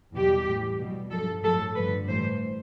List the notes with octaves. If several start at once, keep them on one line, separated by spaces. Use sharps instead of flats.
E2 B2 G3 G4
A2 E3 G3
B2
G3
G2 F3 A4
A2 F3 A4
G2 D3 F3 B4
A2 E3 G3 C5